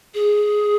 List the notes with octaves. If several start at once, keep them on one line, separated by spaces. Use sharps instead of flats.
G#4